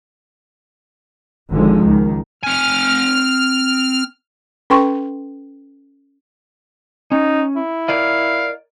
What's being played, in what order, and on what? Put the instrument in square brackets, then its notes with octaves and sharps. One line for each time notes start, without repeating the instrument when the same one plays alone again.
[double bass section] G#1 D3 F3 G#3
C#2 D#3
[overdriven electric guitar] C4 G#5 [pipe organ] F6
[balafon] C#4 A4 B4 G5 C6 C#6
[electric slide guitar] C#4 [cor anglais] D#4
[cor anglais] E4
[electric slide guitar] A#4 D5 D#5 [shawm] F5